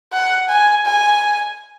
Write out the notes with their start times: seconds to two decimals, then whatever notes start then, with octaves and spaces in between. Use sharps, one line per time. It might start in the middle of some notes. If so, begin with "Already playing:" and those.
0.13 F#5
0.49 G#5
0.86 G#5